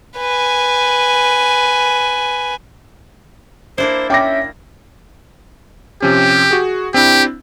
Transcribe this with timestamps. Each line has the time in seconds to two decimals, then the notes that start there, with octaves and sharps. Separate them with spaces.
0.17 B4 G#5
3.78 A#3 D4 E4 C5
4.10 C#4 E5 G5 D6 A#6
6.02 C3 F3 C#4 G4
6.51 F#4 G#4
6.94 C4 D4 E4 G4